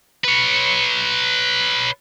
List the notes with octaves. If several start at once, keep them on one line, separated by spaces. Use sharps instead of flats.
B4 C#5